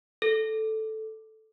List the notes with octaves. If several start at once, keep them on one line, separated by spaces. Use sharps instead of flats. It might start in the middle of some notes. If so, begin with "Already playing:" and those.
A4